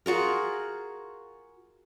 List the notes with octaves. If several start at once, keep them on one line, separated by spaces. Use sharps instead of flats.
F4 F#4 G#4 A#4